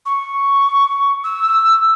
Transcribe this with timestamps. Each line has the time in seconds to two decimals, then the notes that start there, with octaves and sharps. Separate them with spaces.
0.06 C#6
1.24 E6